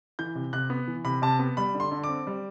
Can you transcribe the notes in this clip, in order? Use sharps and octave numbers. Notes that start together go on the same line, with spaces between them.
E3 G6
C3
C3 F#6
B3
E3
C3 B5
C3 A5
B3
G3 B5
D3
C6
D3
C4 D6
G3